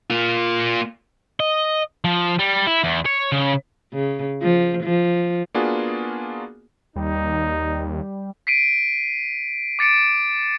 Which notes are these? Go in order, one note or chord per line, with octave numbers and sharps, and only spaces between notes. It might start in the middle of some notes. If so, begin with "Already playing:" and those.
A#3 F4
D#5
F3
G3
E4
E2
C#5
C#3
C#3
F3
F3
A#3 B3 D4 F4 F#4 G#4
D#2 G3 D#4
B6 C7 D7 D#7
D6 A6 C#7 D7